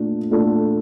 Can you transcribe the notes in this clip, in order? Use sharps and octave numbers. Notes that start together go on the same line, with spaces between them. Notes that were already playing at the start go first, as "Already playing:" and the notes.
Already playing: A#2 A3 D4 F4 A4
A#2 A3 D4 F4 A4